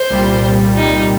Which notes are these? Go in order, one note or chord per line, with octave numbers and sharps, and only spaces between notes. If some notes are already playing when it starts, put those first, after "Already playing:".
Already playing: C5
C2 A#2 G3
D#4